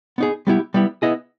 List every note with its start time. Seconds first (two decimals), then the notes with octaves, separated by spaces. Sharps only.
0.18 B3 D#4 G#4
0.47 G3 B3 E4 G4
0.74 G3 B3 E4 G4
1.02 B3 E4 G#4 D#5